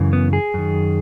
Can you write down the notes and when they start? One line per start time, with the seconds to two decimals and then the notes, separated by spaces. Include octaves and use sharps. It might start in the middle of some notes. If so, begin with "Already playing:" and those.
Already playing: F#2 C#3 E3
0.13 B3
0.33 G#4
0.54 F#2 D#3